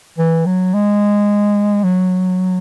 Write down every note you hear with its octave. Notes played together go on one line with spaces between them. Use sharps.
E3
F#3
G#3
F#3